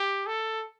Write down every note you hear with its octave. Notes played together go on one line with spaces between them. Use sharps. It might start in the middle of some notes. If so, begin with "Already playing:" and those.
Already playing: G4
A4